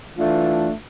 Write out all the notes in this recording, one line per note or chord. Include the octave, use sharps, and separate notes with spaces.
E3 A3 D4 F4